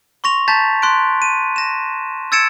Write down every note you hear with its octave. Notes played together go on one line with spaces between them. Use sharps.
C6 C#6 A#6 F7
A5 A#5 G6 A6 B6
C6 F#6 D7
D#7
A#6 E7
E6 G#6 A6 C#7 D7 E7